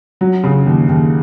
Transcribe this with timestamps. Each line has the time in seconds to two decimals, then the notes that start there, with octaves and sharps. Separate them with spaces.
0.21 F#3
0.44 C#3
0.66 D#2
0.89 D#2